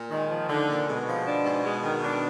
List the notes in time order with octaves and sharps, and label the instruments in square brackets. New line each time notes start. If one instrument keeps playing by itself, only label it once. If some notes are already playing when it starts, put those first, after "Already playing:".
Already playing: [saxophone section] A#2
[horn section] D#3 [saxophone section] G#3
[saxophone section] F3
[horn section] D3 [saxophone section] D#4
[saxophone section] A#2
[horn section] B2 [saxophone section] G#3
[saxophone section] F3
D4
G#2
G#3
D#3
D4